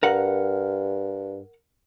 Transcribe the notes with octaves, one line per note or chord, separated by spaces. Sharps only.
G2 A#4 F5 F#5